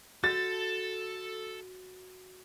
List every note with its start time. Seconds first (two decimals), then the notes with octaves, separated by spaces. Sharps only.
0.24 F#4 A4 A6